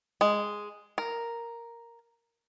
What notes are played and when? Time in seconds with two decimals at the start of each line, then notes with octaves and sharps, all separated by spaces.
0.21 G#3
0.98 A#4